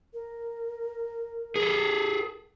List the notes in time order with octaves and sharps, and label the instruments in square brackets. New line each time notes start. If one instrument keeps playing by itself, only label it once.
[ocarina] A#4
[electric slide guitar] G#4 A4